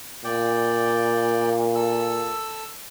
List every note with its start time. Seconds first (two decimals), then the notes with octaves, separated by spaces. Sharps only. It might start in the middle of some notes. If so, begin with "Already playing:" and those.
0.24 A#2 D5 G5
1.76 A4 E6